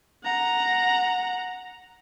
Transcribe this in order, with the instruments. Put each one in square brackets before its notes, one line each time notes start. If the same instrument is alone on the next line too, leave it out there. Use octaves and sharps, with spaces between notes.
[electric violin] F#5 A#5